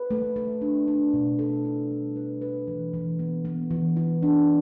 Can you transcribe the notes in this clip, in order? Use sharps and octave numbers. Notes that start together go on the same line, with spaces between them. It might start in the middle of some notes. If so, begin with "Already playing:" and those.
Already playing: B4
A3
A3
D4
D4
B2
A4
E4
G3
B4
B4
E3
E3
B3
B3
E3
E4
D4